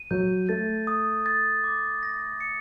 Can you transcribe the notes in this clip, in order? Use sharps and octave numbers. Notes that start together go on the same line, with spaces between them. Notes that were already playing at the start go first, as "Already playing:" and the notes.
Already playing: D#7
F#3 G6
A3 A6
D#6
A6
D6
A#6
C#7